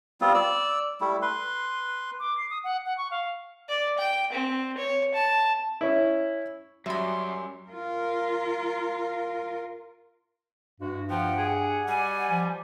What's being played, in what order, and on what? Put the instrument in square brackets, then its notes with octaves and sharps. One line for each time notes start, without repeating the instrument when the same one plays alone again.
[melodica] G3 B3 C4 F4
D5 E6
G3 A3 E4
B4 C6
[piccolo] D6
C7
D#6
F#5
F#5
C#6
F5
[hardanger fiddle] D5
G5
C4
C#5
A5
[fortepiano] C#4 E4
[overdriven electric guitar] F#2 [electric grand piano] F#3 G3 [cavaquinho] E5 B5 [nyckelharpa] C6
[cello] F4 A#4
[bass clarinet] G2 [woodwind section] E3 G#3 F#4
[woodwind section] B2 G4 F#5 [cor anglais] F3 [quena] G5
[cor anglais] G#4
[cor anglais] G3 [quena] G#5
[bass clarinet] F3